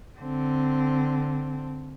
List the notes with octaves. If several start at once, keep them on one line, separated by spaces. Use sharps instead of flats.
D3 C4